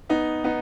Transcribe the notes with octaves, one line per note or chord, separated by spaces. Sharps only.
B3 D#4
B3 D#4